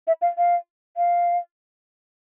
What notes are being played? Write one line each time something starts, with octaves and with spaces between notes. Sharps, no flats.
E5
F5
F5
F5